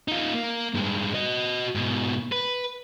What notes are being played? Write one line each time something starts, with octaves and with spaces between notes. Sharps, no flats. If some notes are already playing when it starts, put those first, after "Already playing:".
D#4 F4
A#3
G2 G#3
F#4 D#5
G#2 B2
B4